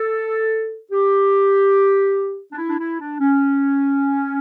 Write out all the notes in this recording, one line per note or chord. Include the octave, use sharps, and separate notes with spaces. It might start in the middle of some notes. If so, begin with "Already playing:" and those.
Already playing: A4
G4
D4
E4
D4
E4
D4
C#4